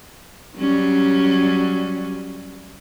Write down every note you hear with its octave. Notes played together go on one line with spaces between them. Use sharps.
F#3 G3 C#4